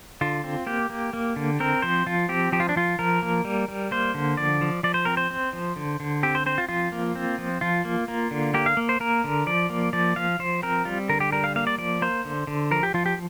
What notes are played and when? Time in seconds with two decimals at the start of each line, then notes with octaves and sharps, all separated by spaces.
0.21 D3 F4
0.44 C4
0.67 A#3 G4
0.90 A#3
1.13 A#3
1.36 D3
1.60 C4 A#4
1.82 F3 C5
2.06 F3 F4
2.29 C4 G4
2.52 F3 G4
2.60 F4
2.69 D4
2.76 F3 F4
2.99 F3 A#4
3.22 A#3
3.45 G3
3.68 G3
3.91 A#3 C5
4.14 D3
4.37 F3 D5
4.61 F3
4.83 F3 D5
4.94 C5
5.05 C4 A#4
5.17 C5
5.31 C4
5.53 F3
5.76 D3
6.00 D3
6.23 C4 G4
6.35 C5
6.46 C4 C5
6.58 F4
6.69 F3 F4
6.92 A#3
7.15 C4
7.38 F3
7.61 F3 F4
7.85 A#3
8.08 A#3
8.31 D3
8.54 A#3 G4
8.66 F5
8.77 A#3
8.89 C5
9.00 A#3 A#4
9.24 D3
9.47 F3 D5
9.70 A#3
9.93 F3 D5
10.16 F3 F5
10.39 F3 C5
10.63 C4 A#4
10.85 G3 F4
11.09 D3 A#4
11.20 G4
11.32 G3 A#4
11.44 F5
11.56 A#3 F5
11.67 D5
11.78 F3 D5
12.02 A#3 C5
12.25 D3
12.47 D3
12.71 F3 A#4
12.83 G4
12.94 F3 F4
13.06 G4